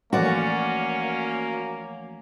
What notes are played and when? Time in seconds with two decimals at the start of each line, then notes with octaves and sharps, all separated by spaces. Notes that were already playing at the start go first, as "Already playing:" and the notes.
0.13 E3 F3 A3 A#3 C#4 F#4 D5